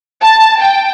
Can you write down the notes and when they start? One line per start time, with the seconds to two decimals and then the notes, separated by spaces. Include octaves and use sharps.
0.22 A5
0.62 G5